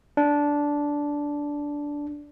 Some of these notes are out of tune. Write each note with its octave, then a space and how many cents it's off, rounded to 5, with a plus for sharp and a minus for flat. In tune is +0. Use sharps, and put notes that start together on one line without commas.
D4 -10